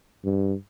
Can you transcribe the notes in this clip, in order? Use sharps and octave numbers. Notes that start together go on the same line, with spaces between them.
G2